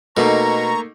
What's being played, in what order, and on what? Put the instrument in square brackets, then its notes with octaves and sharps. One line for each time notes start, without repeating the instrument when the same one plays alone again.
[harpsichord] B2 [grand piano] A3 A#3 D#4 [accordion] A#5 C#6